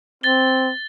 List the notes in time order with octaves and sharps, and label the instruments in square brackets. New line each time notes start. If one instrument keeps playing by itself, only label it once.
[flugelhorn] C4 [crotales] A6 G7